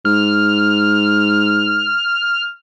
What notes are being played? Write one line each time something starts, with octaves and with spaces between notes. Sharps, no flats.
G#2 F6